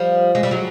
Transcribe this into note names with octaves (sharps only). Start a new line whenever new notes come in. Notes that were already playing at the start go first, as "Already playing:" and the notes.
Already playing: F3 G3
G#3
G3
F#3 G#3